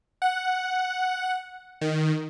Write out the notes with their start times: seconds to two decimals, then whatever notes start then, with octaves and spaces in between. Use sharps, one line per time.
0.22 F#5
1.81 D#3